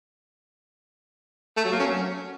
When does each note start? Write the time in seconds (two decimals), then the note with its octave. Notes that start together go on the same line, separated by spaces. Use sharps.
1.57 A3
1.64 F#3
1.72 A#3
1.80 C#4
1.87 F#3